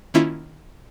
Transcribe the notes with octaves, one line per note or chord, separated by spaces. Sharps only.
D#3 A#3 C#4 E4 F4